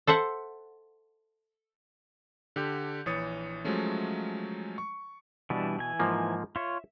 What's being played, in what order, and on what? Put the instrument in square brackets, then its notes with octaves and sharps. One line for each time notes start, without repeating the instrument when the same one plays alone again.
[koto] A4 C5 E5 F#5
[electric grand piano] D3 G4 G6
A#1 E3 C#5 D#6 A6 C#7
F3 F#3 G#3 A3 C#4
C#6
[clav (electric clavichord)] B2 [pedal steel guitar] E3 G3 D4
[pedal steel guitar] E3 G#5
[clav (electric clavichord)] G#2 F3 A#3
[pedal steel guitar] F4 C#5 [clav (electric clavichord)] E5